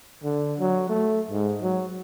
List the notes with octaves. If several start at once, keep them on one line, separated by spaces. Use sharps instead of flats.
D3
F#3
A3
G#2
F#3